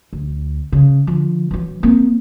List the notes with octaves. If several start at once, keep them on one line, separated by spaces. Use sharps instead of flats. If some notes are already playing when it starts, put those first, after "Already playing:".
D2
C#3
D3 F3
E3 F#3
A#3 C4